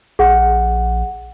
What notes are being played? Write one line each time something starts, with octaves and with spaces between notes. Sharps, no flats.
A#1 G#4 F#5